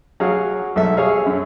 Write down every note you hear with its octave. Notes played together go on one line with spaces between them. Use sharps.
F#3 G#4 F5
B1 A4 E5
G#4 C#5 E5 F5
F#2